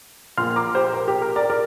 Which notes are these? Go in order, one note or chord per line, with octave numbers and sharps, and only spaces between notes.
A#1 A#2 A#3 C6 F6
A#5 D6
G4 C5
A#4
G4
A#4
A#4 D5
A#4 D5